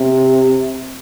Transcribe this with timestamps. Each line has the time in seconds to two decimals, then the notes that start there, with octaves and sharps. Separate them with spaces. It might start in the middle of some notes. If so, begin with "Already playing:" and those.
Already playing: C3